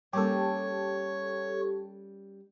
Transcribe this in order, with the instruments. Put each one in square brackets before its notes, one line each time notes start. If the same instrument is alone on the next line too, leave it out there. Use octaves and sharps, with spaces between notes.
[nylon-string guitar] G3 A#3 C#4 [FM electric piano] G4 A4 [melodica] C#5